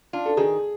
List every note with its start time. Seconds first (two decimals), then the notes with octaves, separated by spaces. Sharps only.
0.13 D4 F4
0.26 A4
0.37 D#3 G#4